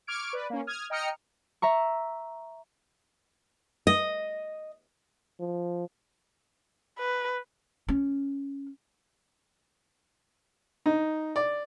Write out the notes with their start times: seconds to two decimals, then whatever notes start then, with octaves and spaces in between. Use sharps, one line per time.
0.07 C#6 D6 F6 G#6 D7
0.33 B4 D5
0.50 A#3 C#4
0.67 D#6 F6 G#6
0.90 D#5 G5 A#5 D#6 F6 C#7
1.62 E5 A#5 C#6
3.87 D#5
5.40 F3
6.99 B4
7.89 C#4
10.86 D#4
11.36 D5